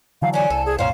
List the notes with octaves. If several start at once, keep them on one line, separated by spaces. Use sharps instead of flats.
D3 E3 F#3 F5
C#4 D4 G#5
C2 A4
G#4
C2 F#2 A#2 C#4 C5 F5